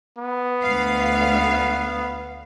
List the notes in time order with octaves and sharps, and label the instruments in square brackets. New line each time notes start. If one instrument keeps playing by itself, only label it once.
[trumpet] B3
[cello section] D2 F5